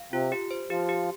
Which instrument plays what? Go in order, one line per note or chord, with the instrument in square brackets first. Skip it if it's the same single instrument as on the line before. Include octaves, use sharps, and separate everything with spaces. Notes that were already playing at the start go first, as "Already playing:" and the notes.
Already playing: [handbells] F5
[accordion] C3 C4 [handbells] F4
[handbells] G4
C5
[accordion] F3 F4 [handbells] G4
[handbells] G4